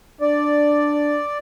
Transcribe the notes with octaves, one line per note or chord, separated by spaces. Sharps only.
D4 D5